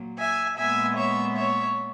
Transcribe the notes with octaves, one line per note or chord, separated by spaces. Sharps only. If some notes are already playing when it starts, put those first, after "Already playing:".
Already playing: A#2 F#3 A#3
E5 G#5
A#2 G#3 B3 E5 G#5
C#5 E5
C#5 E5